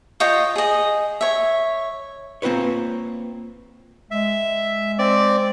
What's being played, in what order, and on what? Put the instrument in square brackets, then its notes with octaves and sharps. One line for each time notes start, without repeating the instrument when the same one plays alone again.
[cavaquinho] F4 C#5 D#5 G5
G#4 D#5
C#5 E5
[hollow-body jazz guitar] A#3 C4 F4 B4 C#5
[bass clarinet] G#3 [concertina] E5
[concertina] C4 D5